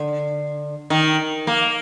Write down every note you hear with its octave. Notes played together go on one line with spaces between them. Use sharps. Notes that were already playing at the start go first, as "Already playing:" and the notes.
Already playing: D3
D#3
A#3